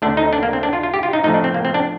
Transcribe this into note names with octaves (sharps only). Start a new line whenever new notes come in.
D2 D3 A3 D4
D#4
D4
A#3
C4
D4
F4
F4
G4
F4
D#4
A2 F3 A3 D#4
D4
C4
A#3
C4
D4